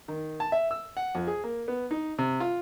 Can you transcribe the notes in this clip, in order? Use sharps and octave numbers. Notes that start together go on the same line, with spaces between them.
D#3
A5
E5
E6
F#5
F2
G#4
A#3
B3
D#4
C3
F4